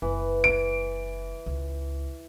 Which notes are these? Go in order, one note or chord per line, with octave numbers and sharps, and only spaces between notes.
F#1 E3
D7
C#2